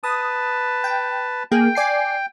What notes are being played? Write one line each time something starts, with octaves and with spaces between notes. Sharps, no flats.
B4 A5 D#6
G5
A#3 G#4 G5
D5 G#5 C7